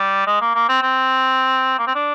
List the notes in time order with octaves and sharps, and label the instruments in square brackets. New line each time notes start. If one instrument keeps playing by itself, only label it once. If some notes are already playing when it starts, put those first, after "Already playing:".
Already playing: [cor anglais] G3
G#3
A#3
A#3
C4
C4
A#3
C4
D4